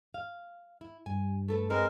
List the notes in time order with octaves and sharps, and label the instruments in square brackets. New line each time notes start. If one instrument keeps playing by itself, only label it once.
[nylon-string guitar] F5
E4
[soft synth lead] G2 [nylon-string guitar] G#5
[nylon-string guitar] A3 A4 B4
[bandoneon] G#3 A#4 [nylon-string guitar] C4 D#4 B4